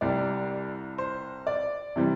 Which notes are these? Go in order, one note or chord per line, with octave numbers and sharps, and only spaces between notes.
C2 C3 G3 D5
C5
D5
C3 E3 G3 C4